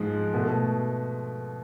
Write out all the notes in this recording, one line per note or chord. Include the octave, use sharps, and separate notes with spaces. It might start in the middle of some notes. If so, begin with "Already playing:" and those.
Already playing: G#2 F3 G#3
B2 A3